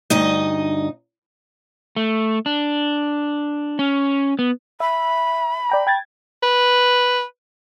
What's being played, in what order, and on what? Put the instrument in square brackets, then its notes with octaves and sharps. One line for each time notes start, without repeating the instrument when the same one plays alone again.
[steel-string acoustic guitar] D2 G2 D#4 D#5
[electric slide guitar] A3
D4
C#4
B3
[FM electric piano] E5 [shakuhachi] B5
[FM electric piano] D5 G5 A#5
G5 G#6 A6
[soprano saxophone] B4